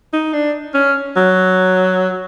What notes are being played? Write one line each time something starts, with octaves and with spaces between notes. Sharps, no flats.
D#4
D4
C#4
F#3